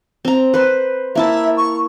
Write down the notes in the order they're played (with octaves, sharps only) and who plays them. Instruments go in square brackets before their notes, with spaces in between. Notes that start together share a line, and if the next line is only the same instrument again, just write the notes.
[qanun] C4 A#5
B4 C5
[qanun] A#3 E4 A5 [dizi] E5
[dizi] C#6